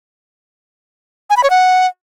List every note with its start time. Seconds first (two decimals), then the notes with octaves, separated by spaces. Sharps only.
1.30 G#5
1.37 B5
1.43 C#5
1.50 F#5